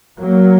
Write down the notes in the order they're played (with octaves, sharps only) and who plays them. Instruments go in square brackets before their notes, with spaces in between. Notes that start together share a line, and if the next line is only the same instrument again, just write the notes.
[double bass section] F#3 A#3